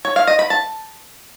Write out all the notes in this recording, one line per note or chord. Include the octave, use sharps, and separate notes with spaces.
C#5
F5
D#5
B5
A5